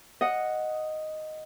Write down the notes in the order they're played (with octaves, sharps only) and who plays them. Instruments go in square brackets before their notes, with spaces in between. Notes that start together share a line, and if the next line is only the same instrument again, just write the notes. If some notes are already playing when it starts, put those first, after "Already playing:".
[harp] D#5 F#5